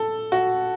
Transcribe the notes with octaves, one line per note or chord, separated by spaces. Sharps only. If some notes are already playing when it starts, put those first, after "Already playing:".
Already playing: A4
F#4